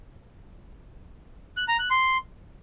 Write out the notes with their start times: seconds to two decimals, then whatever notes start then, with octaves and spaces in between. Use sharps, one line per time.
1.57 F#6
1.68 A#5
1.79 F#6
1.91 C6